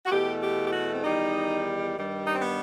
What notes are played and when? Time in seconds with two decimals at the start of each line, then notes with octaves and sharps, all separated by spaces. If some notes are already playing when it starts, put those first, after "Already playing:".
0.05 F#4
0.11 E2 B2 A3 G4
0.41 G4
0.66 G4
0.73 F#4
0.93 C4
1.03 E2 D#3 G3 D#4
1.96 G2 D#3 G3
2.27 D#4
2.35 C4
2.42 B3